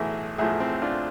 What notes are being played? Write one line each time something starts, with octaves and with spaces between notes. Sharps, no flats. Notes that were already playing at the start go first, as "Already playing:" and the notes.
Already playing: B1 A2 E3 E4 G#4
B1 A2 F3 E4 G#4
C4 E4
D4 F4